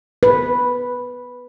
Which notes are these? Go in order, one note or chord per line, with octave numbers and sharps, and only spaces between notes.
B4